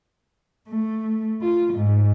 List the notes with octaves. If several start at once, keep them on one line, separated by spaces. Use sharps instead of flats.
A3
F4
G#2